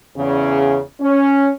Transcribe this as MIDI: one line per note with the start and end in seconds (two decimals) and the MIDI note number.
0.17 0.79 40
0.17 0.79 49
1.01 1.51 61